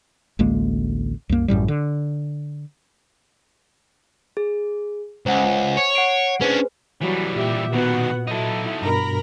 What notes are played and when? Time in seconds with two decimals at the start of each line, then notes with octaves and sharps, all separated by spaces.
0.39 A1 D2 G#3 A#3
1.29 C2 F#2 A#3
1.48 A1 F#2 A2 G3
1.68 D3
4.37 G#4
5.26 C#2 C5 F#5 G#5
5.77 C#5
5.95 F#5 C7 D7
6.41 C#4 D4 G#4 B4 C5
7.02 E3 F#3 G3
7.36 A#2 G4 E5
7.73 B2 D#3 B3 F#4 F#5
8.27 F#3 D#4 E4 A4
8.82 G2 B2 A#4 A#5 B5